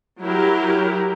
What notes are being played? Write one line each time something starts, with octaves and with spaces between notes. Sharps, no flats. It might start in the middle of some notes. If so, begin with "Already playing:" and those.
F#3 E4 G4 A#4